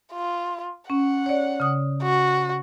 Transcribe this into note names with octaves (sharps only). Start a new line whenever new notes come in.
F4
C#4 F#5
C#5 D5
C#3 D#6
F#4